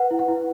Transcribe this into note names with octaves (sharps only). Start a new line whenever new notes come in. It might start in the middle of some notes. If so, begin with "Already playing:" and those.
Already playing: B4 F#5
E4
F#5
E4